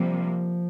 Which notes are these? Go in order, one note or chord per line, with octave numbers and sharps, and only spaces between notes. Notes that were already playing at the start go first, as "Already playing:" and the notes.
Already playing: C3 F3 G3 A#3